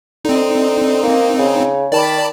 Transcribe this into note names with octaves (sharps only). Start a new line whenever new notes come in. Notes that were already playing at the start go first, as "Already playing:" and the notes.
D3 C4 D#4
A#3
C#3
D#3 D5 A5 B5